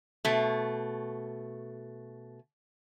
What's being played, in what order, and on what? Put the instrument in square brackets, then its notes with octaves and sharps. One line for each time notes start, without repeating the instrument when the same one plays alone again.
[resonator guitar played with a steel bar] B2 A3